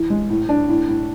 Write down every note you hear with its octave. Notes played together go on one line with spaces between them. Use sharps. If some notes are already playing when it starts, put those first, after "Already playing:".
Already playing: E3
G#3
A2
D4
A2
A2